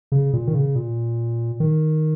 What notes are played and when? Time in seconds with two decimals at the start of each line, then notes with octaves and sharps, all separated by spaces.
0.12 C#3
0.33 A#2
0.48 D#3
0.55 C#3
0.76 A#2
1.60 D#3